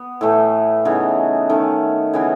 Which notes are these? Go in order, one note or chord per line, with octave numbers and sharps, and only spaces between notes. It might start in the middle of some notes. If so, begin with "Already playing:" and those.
Already playing: B3
A2 E3 A3
C#3 E3 B3 D#4
D#3 A3 C#4
C#3 E3 B3